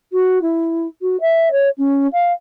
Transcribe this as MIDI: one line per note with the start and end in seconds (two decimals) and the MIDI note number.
0.13 0.39 66
0.42 0.87 64
1.02 1.17 66
1.21 1.49 76
1.51 1.69 73
1.78 2.07 61
2.13 2.32 77